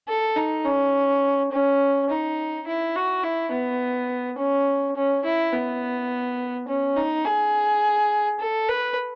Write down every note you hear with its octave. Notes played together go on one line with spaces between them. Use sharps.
A4
D#4
C#4
C#4
D#4
E4
F#4
E4
B3
C#4
C#4
E4
B3
C#4
D#4
G#4
A4
B4